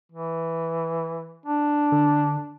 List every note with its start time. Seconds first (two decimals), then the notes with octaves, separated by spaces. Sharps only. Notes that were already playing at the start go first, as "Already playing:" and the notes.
0.12 E3
1.46 D4
1.92 D3